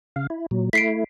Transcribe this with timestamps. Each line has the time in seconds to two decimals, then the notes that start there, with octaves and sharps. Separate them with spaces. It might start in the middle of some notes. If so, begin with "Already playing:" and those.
0.16 C#3 F5
0.30 E4
0.51 A#2 F#3
0.73 A3 E4 B6 C7 D7